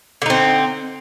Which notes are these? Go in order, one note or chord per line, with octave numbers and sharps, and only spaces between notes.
D3 C4 D#4